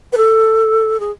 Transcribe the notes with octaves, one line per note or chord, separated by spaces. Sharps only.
B4
A4
G#4